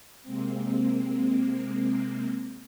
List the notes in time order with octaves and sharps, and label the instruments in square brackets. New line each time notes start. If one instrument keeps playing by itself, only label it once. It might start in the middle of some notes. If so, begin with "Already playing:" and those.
[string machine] C3 G#3 A#3 C4